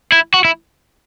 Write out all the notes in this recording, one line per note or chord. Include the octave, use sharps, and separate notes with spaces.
E4
F#4
E4